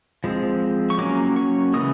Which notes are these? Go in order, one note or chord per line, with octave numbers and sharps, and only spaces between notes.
F3 G#3 C4
C#6
F#3 A#3 C#4 D6
C#6
C#3 E3 G#3 D#6